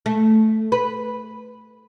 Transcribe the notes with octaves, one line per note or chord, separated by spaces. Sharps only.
A3
B4